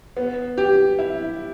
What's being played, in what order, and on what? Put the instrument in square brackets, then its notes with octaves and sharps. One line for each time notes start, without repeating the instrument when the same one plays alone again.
[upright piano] B3
G4
E4